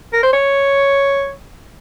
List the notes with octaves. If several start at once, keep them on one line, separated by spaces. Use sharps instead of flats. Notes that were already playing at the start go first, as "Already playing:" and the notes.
A#4
C5
C#5